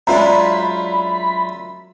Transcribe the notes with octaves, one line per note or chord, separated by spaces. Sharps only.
F#2 G#3 D4 F4 E5 A#5 B5